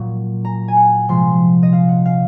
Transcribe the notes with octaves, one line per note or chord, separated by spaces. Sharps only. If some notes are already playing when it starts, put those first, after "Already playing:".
Already playing: A#2 F#3
A#5
G#5
F#5
C3 F3 G#3 C6
D#5
F5
F#5
F5